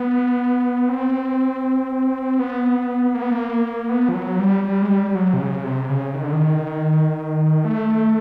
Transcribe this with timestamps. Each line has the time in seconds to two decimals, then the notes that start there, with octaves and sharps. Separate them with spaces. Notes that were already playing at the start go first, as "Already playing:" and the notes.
Already playing: B3
0.89 C4
2.39 B3
3.15 A#3
3.22 B3
3.31 A#3
3.89 B3
4.09 F3
4.14 F#3
4.40 G3
4.65 G3
4.82 G#3
4.89 G3
5.15 F#3
5.34 C3
5.40 C#3
5.64 C3
5.90 C#3
6.14 D#3
6.24 D3
6.33 D#3
7.65 A3